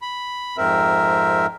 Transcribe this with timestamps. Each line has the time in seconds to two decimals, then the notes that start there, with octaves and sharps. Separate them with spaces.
0.02 B5
0.58 F2 G#2 C4 A#4 E5